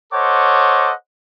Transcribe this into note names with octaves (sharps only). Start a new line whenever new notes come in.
A4 C5 C#5 D#5 F#5 D6